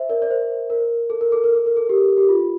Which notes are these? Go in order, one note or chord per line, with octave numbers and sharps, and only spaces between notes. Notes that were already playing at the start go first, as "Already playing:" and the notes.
Already playing: C5 E5
A#4 D5
D5
C5
A#4
A4
A#4
A4
A#4
A4
A#4
A4
G4
G4
F4